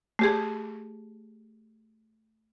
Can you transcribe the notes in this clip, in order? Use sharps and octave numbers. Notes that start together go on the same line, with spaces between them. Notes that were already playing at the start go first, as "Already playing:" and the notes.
A3 G4 G#4